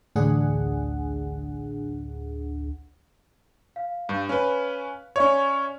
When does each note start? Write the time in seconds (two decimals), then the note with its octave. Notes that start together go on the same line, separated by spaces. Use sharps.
0.16 A1 D2 D4 G#4 F#5
3.76 F5
4.09 G2
4.29 C#4 B4
5.16 C#4 C#5 D5 E5 C#6